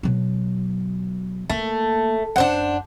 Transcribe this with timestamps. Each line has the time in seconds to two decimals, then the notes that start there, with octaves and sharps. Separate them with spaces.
0.03 B2 F#3
1.50 A3 A#3
2.36 F#2 D4 C5 F#5